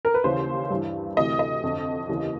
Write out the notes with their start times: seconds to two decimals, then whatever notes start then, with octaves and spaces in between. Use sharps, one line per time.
0.05 A#4
0.14 B4
0.24 D#2 C#3 E3 C5
0.70 G2 E3
1.17 D2 C3 E3 D#5
1.39 D#5
1.63 F2 D3
2.09 D#2 C#3 E3